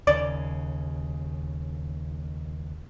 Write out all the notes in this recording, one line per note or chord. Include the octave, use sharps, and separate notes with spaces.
D#2 C#3 D5